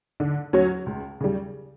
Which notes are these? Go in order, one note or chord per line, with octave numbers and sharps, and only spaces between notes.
D3
F#3 C#4 F#4 C#5
C#2
C#3 G3